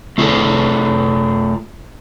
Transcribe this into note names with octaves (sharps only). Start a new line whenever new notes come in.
A3 F4 G#4 A4